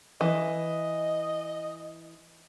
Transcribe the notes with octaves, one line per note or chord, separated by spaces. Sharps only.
E3 D#5